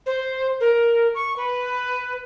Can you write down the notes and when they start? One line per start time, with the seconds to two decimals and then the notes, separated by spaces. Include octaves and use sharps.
0.06 C5
0.60 A#4
1.14 C#6
1.36 B4